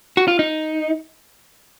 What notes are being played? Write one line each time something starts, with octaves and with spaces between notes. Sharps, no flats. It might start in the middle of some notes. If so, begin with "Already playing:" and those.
F#4
F4
D#4